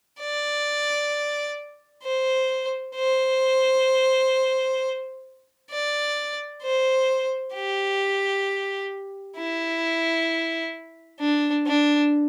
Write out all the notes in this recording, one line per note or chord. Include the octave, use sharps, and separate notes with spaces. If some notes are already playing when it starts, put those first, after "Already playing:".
D5
C5
C5
D5
C5
G4
E4
D4
D4